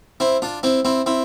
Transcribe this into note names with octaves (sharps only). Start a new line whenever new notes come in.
C4 E4
D4 F4
C4 E4
C4 E4
C4 E4